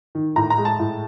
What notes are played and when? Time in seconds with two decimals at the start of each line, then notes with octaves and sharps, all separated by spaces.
0.15 D#3
0.36 A2 A#5
0.50 A#5
0.58 G#3
0.65 A5
0.79 A2